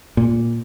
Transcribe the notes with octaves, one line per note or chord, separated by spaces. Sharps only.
A#2